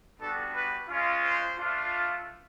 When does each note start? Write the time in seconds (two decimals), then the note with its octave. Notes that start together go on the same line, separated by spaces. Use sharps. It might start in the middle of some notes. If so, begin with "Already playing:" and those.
0.20 G3 B3 D4 F#4 A4
0.54 B4
0.89 G#3 C#4 F4
1.24 C5
1.59 A3 D4 F4